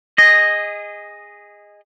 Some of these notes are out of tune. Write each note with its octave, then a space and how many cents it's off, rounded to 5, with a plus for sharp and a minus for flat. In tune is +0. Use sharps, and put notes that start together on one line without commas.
G#4 -20 D#5 +0